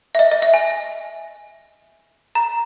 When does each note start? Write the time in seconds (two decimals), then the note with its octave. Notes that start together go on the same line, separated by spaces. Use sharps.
0.15 E5
0.19 D#5
0.31 D#5
0.42 E5
0.54 G#5
2.35 A#5